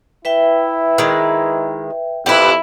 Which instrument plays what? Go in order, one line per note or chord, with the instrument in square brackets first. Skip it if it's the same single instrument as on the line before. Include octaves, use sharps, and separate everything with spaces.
[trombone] E4 [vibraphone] B4 E5 G5
[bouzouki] D#3 G#3
[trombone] F2 [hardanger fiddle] E4 [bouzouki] G4 B4